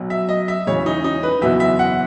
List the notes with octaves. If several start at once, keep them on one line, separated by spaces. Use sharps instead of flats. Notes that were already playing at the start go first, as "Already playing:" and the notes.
Already playing: B1 B2 F#3
E5
D#5
E5
E1 E2 C#3 C#5
D#4
D#4
B4
F#1 E2 B2 F#3 B3 E5
E5
F#5